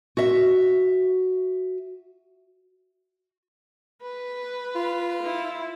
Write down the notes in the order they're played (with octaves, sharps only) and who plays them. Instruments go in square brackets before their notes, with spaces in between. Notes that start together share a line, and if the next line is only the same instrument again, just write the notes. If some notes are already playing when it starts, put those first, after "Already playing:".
[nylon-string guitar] F#4 E5
[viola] B4
[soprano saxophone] F4
[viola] E4